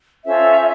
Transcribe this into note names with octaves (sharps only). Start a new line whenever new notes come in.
C#4 F4 A4 C5 E5